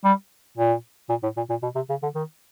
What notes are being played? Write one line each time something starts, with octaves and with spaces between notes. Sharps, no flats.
G3
A#2
A#2
A2
A#2
A#2
B2
C3
C#3
D3
D#3